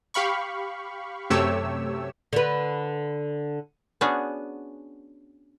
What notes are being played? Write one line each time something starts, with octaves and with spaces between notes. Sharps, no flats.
G4 F5 B5 C#6
F#2 C3 A3 G4 C#5 E6
D3 B4
B3 C#4 D4 F#4 G#4